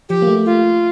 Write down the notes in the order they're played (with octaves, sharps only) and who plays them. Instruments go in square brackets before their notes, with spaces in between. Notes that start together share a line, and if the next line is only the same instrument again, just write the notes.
[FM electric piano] F3 [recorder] G4
[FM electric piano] A#3
A3
[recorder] F4